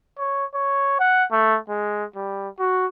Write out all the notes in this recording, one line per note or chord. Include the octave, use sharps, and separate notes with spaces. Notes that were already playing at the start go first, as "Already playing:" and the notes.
C#5
C#5
F#5
A3
G#3
G3
F#4